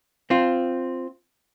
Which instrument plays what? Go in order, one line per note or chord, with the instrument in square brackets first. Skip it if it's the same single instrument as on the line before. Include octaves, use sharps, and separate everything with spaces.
[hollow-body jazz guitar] C4 F4